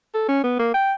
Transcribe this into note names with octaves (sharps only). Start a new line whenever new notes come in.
A4
C#4
B3
A#3
G5